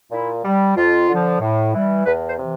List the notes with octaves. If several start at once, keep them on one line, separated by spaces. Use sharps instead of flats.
A#2 E4
G3
F2 F4
D3 F3
A2
E3 G3
E2 B4
C5
C3 E3